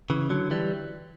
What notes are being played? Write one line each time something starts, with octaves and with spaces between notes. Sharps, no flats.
C#3 E3
D3 F#3
E3 G3